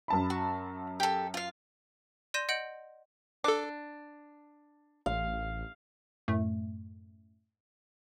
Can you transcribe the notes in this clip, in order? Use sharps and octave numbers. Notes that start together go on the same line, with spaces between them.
F#2 A5 B5
F#4
G4 A4
F4 F5
D5 C6 G6 A#6 D#7 E7
D#5 F#5 G6 D7 F#7
D4 A4 D6
A1 F5
F#2 A2 A3